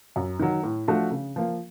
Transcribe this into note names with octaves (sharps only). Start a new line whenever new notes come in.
F#2
D#3 F#3
A2
F3 A3 D4 F#4
C#3
F3 A#3